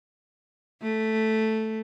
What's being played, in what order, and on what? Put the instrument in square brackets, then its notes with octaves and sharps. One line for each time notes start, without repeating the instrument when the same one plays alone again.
[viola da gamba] A3